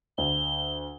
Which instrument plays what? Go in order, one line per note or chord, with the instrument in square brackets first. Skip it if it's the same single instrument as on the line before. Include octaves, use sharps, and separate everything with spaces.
[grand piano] D2 [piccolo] G7